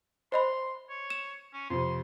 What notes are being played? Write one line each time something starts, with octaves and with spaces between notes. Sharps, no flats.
C5 D#5 B5 C6
C#5
E7
C#4
F2 C3 C6